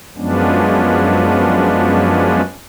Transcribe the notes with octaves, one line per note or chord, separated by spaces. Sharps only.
F#2 F3 G#3 B3 C#4 D4